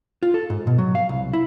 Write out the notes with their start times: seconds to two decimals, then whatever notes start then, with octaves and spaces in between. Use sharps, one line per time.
0.23 F4
0.34 A4
0.50 G#2
0.67 B2
0.78 F#3
0.95 F5
1.09 C2
1.33 E4